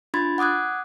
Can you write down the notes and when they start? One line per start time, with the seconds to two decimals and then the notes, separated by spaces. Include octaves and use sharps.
0.14 D4 F4 B5 C6 G#6 A6
0.38 F#5 D6 D#6 F#6 G#6